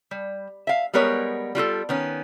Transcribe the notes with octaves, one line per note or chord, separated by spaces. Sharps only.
G3
E5 F5
G3 G#3 B3 A#4 C#5
G3 F4 F#4 A4
D#3 B3 C#4